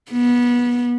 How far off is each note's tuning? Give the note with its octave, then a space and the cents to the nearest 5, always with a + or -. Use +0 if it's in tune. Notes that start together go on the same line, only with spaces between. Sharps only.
B3 -25